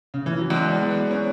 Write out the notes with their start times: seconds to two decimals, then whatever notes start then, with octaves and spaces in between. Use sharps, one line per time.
0.14 C#3
0.26 E3
0.38 F#3
0.50 E2 G#3
0.81 B3
1.11 C#4